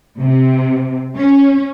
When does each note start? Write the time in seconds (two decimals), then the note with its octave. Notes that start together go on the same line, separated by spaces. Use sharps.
0.20 C3
1.17 C#4